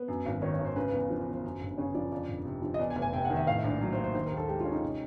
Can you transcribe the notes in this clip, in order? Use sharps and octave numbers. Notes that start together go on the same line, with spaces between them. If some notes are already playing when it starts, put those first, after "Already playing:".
Already playing: B3
F#2
G#1
D#3 C#5
C#5
G#1
C5
C#3 B4
B4
E2
B4
F3 C5
E2
C5
F#2
G1
C#3 C#5
F3 D5
F2 D5
G1
C3
F3
D#5
E2 D5
G#5
F1
G#5
C3 G5
F#5
D#3
E5
A2 F5
E5
A#1
D5
F#3
C5
A#3
C5
D#3 C5
A#4
D#2
A4
G#3 G4
F4
C#4
D#4
C3